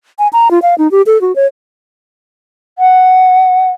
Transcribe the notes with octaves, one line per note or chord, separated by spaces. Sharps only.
G#5
A#5
F4
F5
D#4
G4
A4
F#4
C#5
F#5